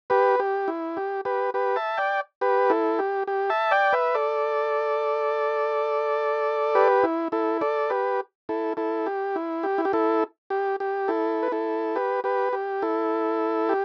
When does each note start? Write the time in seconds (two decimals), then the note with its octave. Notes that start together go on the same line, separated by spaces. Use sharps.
0.10 G4 B4
0.40 G4
0.68 E4
0.97 G4
1.25 G4 B4
1.54 G4 B4
1.76 E5 A5
1.97 D5 G5
2.41 G4 B4
2.70 E4 A4
2.99 G4
3.27 G4
3.50 E5 A5
3.71 D5 G5
3.93 B4 E5
4.15 A4 D5
6.75 G4 B4
7.03 E4
7.32 E4 A4
7.61 A4 D5
7.90 G4 B4
8.49 E4 A4
8.77 E4 A4
9.06 G4
9.36 E4
9.63 G4
9.78 E4
9.85 G4
9.93 E4 A4
10.50 G4
10.80 G4
11.08 E4 A4
11.43 B4
11.52 E4 A4
11.95 G4 B4
12.24 G4 B4
12.53 G4
12.82 E4 A4
13.69 G4